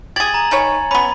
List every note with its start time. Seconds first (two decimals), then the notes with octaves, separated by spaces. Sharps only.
0.16 G4 G#4 G#6 A6 F#7
0.34 A#5
0.51 D#3 B4 C#5 G#5
0.91 B3 C#4 B5